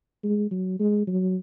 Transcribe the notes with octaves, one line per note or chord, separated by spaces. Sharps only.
G#3
F#3
G#3
F#3